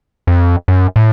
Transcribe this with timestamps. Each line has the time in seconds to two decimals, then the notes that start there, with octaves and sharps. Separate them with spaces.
0.27 F2
0.68 F#2
0.96 A2